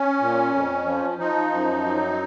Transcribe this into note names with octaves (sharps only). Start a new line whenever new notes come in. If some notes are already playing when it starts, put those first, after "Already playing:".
Already playing: C#4
A#2
F2
F3
F3 D#4
F#2
F#3